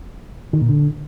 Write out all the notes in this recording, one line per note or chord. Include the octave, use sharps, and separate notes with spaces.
D#3
A#2
D3